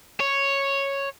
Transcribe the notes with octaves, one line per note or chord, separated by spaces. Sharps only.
C#5